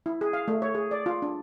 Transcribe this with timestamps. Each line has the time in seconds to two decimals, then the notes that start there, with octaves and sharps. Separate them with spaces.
0.06 E4
0.21 G#4
0.33 F5
0.48 A3
0.62 C#5
0.75 G#4
0.91 D5
1.06 F4
1.22 D4